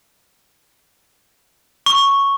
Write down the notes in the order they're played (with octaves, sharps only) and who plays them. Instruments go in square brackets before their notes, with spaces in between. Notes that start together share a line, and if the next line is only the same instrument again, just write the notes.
[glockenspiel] C#6